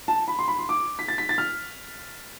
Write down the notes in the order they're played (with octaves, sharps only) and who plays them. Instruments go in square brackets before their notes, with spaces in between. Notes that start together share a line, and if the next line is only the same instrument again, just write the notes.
[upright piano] A5
B5
C6
B5
C6
D6
B6
A6
B6
A6
F6